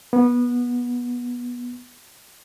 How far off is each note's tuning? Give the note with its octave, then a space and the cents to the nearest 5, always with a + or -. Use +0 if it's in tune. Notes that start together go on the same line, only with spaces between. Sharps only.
B3 -20